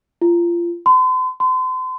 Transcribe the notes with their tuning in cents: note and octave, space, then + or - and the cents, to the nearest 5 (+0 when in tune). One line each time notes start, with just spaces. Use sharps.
F4 -25
C6 -45
C6 -40